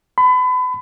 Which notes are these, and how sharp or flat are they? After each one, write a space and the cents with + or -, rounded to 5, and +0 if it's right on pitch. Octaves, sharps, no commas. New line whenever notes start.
B5 +30